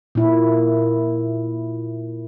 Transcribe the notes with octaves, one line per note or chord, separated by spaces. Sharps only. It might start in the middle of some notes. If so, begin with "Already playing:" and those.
A#2 E4